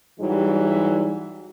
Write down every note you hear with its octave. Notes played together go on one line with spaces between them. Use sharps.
G#2 E3 F#3 G3